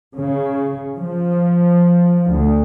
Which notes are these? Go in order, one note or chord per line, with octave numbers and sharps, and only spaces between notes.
C#3
F3
D2